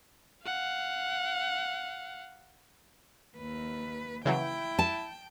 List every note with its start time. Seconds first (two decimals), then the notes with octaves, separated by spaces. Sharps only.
0.43 F5 F#5
3.37 D#2 B4
4.26 C#3 E3 F#3 E4 G5
4.79 A5